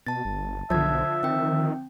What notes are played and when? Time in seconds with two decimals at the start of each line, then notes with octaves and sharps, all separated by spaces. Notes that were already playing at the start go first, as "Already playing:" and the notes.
0.07 B2 A5 A6
0.25 G1
0.70 B1 D3 F3 E5 A5 G#6
1.23 D#3 C4 G5